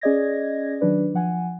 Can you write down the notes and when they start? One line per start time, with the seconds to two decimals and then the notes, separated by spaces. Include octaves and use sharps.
0.01 C#4 G#4 D5 D#5 G#6 A#6
0.81 D#3 F#3 D4 B4 D5
1.14 F3 F#5 G#5